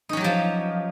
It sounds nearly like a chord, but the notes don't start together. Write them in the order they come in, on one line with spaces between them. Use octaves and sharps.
D#4 C#4 F#3 G4 F3